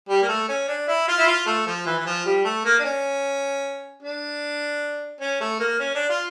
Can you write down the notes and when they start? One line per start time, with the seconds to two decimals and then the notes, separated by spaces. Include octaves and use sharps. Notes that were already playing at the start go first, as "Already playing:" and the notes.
0.09 G3
0.22 A#3
0.28 A3
0.49 C#4
0.68 D4
0.88 E4
1.08 F4
1.18 E4
1.27 F4
1.46 A3
1.66 F3
1.86 E3
1.98 E3
2.06 F3
2.25 G3
2.44 A3
2.65 A#3
2.79 D4
2.84 C#4
4.02 D4
5.20 C#4
5.40 A3
5.59 A#3
5.79 C#4
5.94 D4
6.09 F4